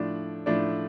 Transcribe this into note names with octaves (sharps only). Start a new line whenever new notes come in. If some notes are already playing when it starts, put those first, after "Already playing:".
Already playing: A2 F3 A3 D4 D5
A2 F3 A3 D4 D5